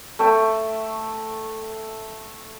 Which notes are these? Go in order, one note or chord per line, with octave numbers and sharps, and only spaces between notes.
A3 A4 E5 G5